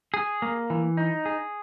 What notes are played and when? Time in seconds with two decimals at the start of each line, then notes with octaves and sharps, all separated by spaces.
0.14 G#4
0.42 A#3
0.70 E3
0.97 D#4
1.25 G#4